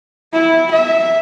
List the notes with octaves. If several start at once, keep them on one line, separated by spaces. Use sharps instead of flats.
E4
E5